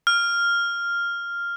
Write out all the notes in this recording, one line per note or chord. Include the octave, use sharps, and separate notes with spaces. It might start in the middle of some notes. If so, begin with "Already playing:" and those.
F6